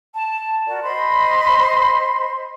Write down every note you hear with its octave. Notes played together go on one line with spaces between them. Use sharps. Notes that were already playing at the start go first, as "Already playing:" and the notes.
A5
F#4 A#4 D5
C5 D#5 B5 C6